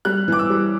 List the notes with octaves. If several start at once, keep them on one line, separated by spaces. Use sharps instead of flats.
G3 F#6
E3 D6
E6
G3